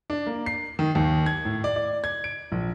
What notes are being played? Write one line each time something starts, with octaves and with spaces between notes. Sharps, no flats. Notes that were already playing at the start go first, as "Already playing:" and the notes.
D4
A#3
C7
D#3
D#2
G#6
A2
D5
D5
G#6
D7
A#1